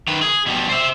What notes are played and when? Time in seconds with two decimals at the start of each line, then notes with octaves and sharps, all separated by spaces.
0.08 D#3 B4
0.22 G#4
0.46 B2 G3
0.69 C5 E5